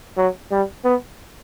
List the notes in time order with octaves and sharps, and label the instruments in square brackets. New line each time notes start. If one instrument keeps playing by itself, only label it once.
[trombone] F#3
G3
B3